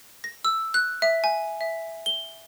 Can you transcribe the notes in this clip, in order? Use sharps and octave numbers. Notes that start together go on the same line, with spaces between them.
A#6
E6
F#6
E5
G#5
E5
G7